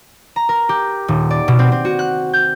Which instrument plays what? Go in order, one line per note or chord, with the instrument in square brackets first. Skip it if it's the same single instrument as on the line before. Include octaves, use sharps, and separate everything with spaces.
[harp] A#5
A#4
G4
D#1
D5
B2
C4
C4
F#4
F#6
G6